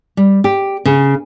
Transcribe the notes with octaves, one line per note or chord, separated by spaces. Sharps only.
G3
G4
C#3